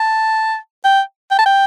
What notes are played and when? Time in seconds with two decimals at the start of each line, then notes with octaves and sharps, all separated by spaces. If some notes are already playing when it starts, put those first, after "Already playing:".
Already playing: A5
0.85 G5
1.31 G5
1.39 A5
1.46 G5